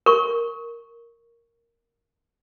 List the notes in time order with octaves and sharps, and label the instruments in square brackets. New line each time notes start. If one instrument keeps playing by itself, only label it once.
[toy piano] A#4 C#6